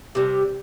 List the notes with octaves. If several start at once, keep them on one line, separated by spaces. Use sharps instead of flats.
C3 G3